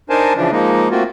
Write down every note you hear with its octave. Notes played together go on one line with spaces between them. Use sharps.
D4 D#4 A#4 C5 G#5 A5
C#3 E3 F3 D4
F3 G#3 A#3 D#4
A3 A#3 C4 F4 F#4